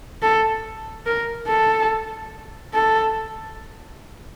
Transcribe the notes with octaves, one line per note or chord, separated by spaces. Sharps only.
A4
A#4
A4
A4